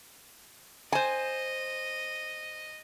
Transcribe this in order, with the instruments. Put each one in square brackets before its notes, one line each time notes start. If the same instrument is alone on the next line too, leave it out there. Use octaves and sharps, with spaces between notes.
[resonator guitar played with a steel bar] C5 G#5 [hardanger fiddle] D#5